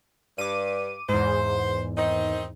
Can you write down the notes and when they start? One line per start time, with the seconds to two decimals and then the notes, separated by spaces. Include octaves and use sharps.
0.38 G2 D6 D#7
1.09 E2 G#2 C5
1.97 D#3 C4 D#4